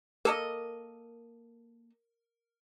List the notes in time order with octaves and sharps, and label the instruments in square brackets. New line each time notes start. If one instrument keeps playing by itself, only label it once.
[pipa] A#3 A4 D#5 [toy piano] A#4